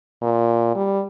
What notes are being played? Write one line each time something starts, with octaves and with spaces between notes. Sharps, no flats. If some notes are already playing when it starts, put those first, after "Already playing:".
A#2
G3